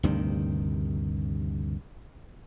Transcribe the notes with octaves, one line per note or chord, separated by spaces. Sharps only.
D2 G2 C3 D#3